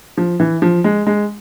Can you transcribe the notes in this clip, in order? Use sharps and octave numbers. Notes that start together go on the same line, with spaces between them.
F3
E3
F3
G#3
G#3